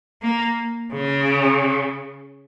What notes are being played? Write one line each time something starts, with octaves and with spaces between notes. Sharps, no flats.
A#3
C#3